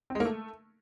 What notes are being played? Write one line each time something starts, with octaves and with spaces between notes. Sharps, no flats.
C4
G#3
A#3
A3